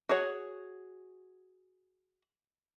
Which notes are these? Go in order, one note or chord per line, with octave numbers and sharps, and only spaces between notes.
F#4 G#4 C#5 F#5